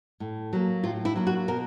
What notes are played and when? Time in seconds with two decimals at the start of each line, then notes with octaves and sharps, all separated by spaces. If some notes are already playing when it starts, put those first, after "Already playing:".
0.20 A2
0.53 F#3 A#3
0.84 A2 F4
1.05 E4
1.16 F#3 A#3
1.27 F#4
1.48 B2 A#4